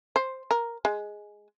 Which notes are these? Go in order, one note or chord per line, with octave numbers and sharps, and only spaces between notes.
C5
A#4
G#3